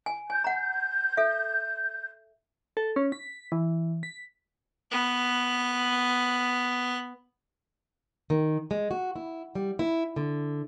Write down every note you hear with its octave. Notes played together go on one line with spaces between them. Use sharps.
G#5
G#5 G6
F#5 A#5
A4 E5
A4
C#4
B6
E3
B6
B3 F#6
D#3
G#3
F#4
E4
G3
E4
D3